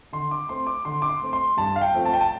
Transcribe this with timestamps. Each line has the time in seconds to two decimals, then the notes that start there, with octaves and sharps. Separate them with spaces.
0.13 D3 C6
0.31 D6
0.49 A3 C4 C6
0.67 D6
0.85 D3 C6
1.02 D6
1.09 C6
1.22 A3 C4
1.33 C6
1.57 G2 A5
1.76 F5
1.81 G5
1.94 F3 A3 C4
2.06 A5
2.14 G5
2.20 A5